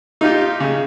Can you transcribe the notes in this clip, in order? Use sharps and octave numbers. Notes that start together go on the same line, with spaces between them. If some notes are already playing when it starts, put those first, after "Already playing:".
D#4 F4 G4
C#3